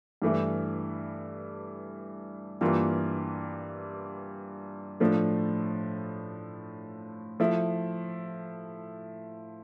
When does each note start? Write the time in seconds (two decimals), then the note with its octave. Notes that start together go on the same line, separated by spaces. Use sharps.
0.22 G2 E3 A3 E4
2.61 G2 E3 A#3 F4
5.00 A2 F3 A3 D4
7.40 F3 A3 E4